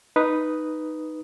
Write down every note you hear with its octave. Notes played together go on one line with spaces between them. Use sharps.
D#4 B4 D#6